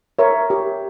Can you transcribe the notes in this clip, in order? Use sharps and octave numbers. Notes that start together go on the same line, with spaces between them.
A#4 C#5 E5
G4